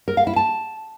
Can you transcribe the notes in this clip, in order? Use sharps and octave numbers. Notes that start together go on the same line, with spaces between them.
A#4
F5
E4
A5